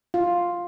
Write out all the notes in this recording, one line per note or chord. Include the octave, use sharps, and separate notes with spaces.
F4